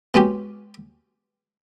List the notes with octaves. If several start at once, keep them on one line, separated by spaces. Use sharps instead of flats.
B2 G#3 C#4 G4